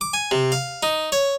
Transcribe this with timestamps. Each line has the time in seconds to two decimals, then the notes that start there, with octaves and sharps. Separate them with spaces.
0.01 D6
0.13 G#5
0.31 C3
0.52 F5
0.83 D#4
1.12 C#5